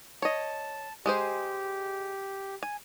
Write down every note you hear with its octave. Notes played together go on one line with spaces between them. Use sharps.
C#5 D#5 A5
G#3 G4 G#4 C5
G#5